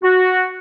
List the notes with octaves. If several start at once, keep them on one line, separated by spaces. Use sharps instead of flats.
F#4